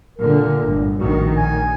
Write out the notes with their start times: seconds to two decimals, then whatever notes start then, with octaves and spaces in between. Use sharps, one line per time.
0.18 A#2 D3 A#4
0.63 G1 A2
0.98 A#1 A2 D#3 F#4
1.37 G#5